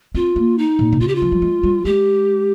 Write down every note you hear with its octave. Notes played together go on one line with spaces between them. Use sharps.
C4 F4
A#3
D#4
A#2
C3
C#3 F4
G4
F4
F3
G3
G#3
G3
G#3 G4